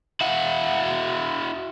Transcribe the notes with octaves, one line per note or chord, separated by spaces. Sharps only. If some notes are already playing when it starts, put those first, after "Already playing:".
E4 F#4